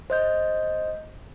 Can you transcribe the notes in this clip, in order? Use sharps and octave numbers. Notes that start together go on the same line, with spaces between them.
C5 D#5 G6